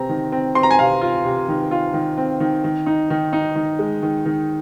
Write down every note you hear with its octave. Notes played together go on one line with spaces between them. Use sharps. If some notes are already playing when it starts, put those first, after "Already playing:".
Already playing: C3 C4 A#5
D#3
C4
C4 C6
A#5
G#5
C3 F5
F4
C3
D#3
F4
D#3
C4
D#3
D#3
D#4
D#3
D#4
D#3
G#3
D#3
D#3